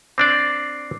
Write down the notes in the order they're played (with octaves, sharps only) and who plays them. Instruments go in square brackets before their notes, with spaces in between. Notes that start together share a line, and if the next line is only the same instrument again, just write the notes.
[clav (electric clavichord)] C4 D4 D5 [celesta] D6 C7